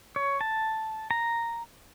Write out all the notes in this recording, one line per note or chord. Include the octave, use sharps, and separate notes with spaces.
C#5
A5
A#5